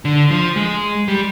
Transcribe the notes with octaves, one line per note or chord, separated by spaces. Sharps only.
D3
F3
G#3
G3